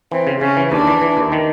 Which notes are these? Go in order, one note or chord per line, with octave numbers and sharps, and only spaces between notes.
E3 C4
C#3
C#3 C#4
E3
D#2 D4
E3
E3
D#2
D#3